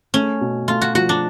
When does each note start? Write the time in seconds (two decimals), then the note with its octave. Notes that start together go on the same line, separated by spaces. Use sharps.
0.14 A3 C#4
0.41 B2
0.68 A3 F4
0.81 F#4
0.95 F3 F#4
1.09 D4